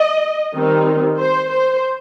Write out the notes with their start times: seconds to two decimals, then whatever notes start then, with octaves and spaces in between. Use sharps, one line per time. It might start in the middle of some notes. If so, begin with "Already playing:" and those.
Already playing: D#5
0.54 D#3 G3 C4 D#4
1.18 C5
1.50 C5